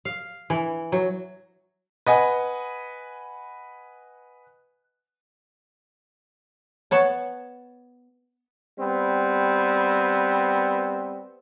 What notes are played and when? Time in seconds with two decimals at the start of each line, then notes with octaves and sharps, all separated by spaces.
0.05 F5
0.50 E3
0.92 F#3
2.06 B4 D#5 F#5 G#5
6.91 B3 C#5 A5
8.79 G3 B3 C4